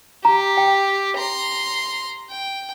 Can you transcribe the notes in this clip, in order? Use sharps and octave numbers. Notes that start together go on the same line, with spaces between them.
G4 A#5
G5
A#5 C6
G5